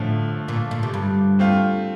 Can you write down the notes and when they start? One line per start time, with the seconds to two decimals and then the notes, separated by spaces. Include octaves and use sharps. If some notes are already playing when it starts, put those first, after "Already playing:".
Already playing: A2 D3 F3 A3
0.48 A#2
0.71 A#2
0.83 C3
0.94 G2
1.39 A3 C4 F4